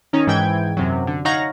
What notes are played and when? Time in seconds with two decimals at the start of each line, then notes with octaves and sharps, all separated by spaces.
0.13 D#3 C#4 D#4
0.27 G#2 E3 G5 G#6
0.77 F#2 C3 F#3
1.07 D3
1.25 D#4 C#5 F5 F#5 A#5